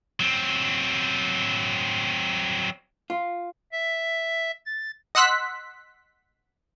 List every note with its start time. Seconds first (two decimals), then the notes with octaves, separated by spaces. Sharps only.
0.20 F#3 C4
3.10 F4
3.72 E5
4.66 A6
5.15 D#5 F#5 C6 E6 F#6 B6